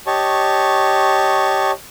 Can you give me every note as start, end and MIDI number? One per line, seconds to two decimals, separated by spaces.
0.07 1.71 67
0.07 1.71 73
0.07 1.71 75
0.07 1.71 81
0.07 1.71 85